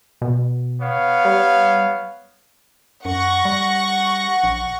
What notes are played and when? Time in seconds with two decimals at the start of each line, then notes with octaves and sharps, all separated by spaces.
0.22 B2
0.81 B3 C#5 F5
1.25 G3
3.05 F#2 F#5 C#6 A#6
3.45 G3
4.44 A#1